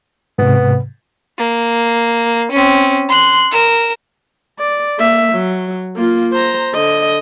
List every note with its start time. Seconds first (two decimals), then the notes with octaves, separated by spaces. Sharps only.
0.39 G#2 C3 B3
1.38 A#3
2.52 C4 C#4
3.09 C6 F#6
3.52 A#4 E7
4.58 D5
4.98 A#3 E5
5.33 F#3
5.96 A#3 F4
6.33 C5 A#5
6.74 D3 D#5